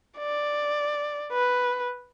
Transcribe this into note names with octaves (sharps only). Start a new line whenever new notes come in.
D5
B4